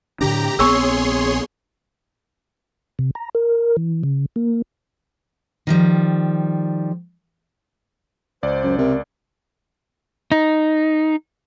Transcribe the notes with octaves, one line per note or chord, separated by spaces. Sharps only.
A2 D3 D4 G4 A#5
A#1 B3 C4 G#4 C#5 C6 C#6 E6
C3
A#5
A#4
E3
C#3
A#3
D#3 F3 G3
C#2 C5 D5
F#2
C3 A#4
D#4